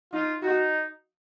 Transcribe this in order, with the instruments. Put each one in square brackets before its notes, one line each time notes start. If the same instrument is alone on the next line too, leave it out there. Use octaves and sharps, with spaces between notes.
[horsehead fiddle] D#4 [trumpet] F4
[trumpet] D#4 [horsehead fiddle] F#4